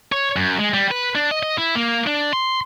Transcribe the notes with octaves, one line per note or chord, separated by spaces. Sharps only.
C#5
F#2
G#3
G3
B4
D4
D#5
D#5
E4
A#3
D4
C6